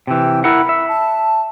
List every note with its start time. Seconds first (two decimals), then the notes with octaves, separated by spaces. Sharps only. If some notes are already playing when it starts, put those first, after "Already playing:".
0.07 C3 E3 G5
0.44 E4 A#4 F#5 B5
0.69 E5
0.89 A5